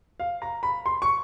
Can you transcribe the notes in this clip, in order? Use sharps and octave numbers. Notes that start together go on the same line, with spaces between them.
F5
A#5
B5
C6
C#6